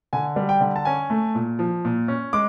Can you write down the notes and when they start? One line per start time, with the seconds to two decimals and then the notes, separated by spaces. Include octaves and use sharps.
0.13 D3 G#5
0.36 G3
0.49 G5
0.61 D3
0.76 A5
0.85 C#4 G#5
1.10 A3
1.35 A#2
1.59 F3
1.85 A#2
2.08 C#4
2.33 G#3 D6